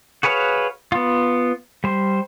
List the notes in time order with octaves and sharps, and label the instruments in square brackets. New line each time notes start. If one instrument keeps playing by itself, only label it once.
[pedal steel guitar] F#4 G#4 B4 C#5 F5
B3 F4
G3 C5